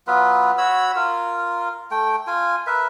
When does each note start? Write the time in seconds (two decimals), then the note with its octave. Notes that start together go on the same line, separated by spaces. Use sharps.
0.07 F#3 B3 F4 B4
0.58 F#4 C#5 B5 E6
0.96 F4 A#4
1.91 A3 G5
2.27 F4 G#5
2.67 A#4 B4 E5